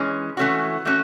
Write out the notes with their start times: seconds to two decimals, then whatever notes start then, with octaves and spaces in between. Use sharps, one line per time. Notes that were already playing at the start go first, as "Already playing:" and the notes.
Already playing: E3 G#3 C#4
0.37 E3 A3 C#4 F#4
0.85 E3 A3 C#4 F#4